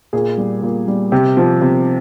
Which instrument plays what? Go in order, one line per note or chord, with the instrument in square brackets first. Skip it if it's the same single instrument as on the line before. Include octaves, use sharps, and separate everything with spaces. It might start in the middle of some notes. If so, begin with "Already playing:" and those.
[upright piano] A#2 G#4
G3
A#2
G3
C3 G4
F3
C3